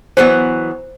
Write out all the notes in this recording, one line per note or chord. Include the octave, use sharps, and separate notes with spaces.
E3 F#3 B3 C5